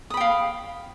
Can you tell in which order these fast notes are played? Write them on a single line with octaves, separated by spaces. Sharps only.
D#6 B5 G5 F5